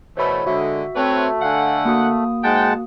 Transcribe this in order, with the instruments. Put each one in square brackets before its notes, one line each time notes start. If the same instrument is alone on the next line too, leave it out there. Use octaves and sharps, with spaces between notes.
[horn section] B2 E3 A3 [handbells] C5 C#5 B5
[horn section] D3 G#3 [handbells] F#4 E5
[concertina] A3 [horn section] C4 B4 C#5
[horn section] D3 F#5 [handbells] F5 G#5
[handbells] A#3 F#4 D#6
[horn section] G#2 G5 [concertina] G#3 F#5 A5